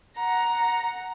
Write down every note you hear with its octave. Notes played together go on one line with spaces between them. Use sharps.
F#5 A#5